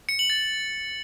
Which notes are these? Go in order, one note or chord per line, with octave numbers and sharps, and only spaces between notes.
C#7
F#7
A6